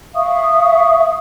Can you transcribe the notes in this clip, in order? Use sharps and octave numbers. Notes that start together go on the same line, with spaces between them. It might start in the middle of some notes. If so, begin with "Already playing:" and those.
E5 F5 C#6 D#6